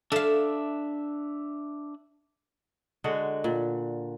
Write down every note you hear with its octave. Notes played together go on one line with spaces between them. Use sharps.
D4 A4 E5 F5
D3 G#3 F#4
A#2